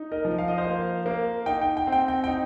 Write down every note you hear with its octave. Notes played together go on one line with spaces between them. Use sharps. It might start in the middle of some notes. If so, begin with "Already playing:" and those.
Already playing: D#4
A#4 D#5
F3
F5
D#5
C5 F5
A#3
A#3
D#4 G5
G5
G5
C4
G5
G5
G5
D#4